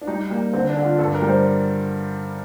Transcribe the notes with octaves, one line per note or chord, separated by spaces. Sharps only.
D4
G3 D#4
G3 A#3
D3 C4
D4
D3
F4
G2 A4
A#4
G3
C5